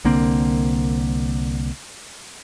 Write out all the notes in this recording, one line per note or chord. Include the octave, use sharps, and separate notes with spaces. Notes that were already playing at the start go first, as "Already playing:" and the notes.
C2 D3 A#3 C4